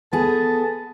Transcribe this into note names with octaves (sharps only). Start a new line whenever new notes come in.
B3 G#4 A4 A5